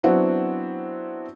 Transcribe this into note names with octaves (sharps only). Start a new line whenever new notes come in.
F#3 B3 C4 D4 E4 F#4